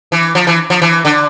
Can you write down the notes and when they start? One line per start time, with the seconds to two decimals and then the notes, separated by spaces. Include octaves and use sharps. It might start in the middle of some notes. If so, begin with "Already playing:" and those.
0.12 E3
0.35 F3
0.47 E3
0.70 F3
0.82 E3
1.05 D3